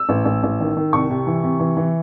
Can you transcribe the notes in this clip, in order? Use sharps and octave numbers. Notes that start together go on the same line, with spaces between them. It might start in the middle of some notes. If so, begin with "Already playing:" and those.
Already playing: E6
A1
A1
A1
D#3
D#3
C2 C#6
C3
E3
C3
E3
E3